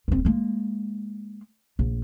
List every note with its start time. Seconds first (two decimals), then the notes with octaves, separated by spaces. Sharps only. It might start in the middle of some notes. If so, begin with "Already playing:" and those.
0.08 D#1 C4
0.25 G#3 A#3
1.79 A#1